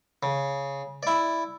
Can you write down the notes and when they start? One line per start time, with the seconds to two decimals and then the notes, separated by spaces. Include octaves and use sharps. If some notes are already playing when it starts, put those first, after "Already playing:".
0.23 C#3
1.03 E4 D5